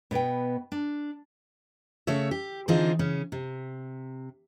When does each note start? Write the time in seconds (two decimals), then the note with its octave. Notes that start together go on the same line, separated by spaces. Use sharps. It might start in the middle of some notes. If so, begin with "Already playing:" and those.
0.11 B2 B3 B4 G5
0.72 D4
2.07 C#3 A3 C#5 E5
2.31 G4
2.68 D3 E3 C4 D#4 F4 G#4
2.99 C#3 C#4
3.32 C3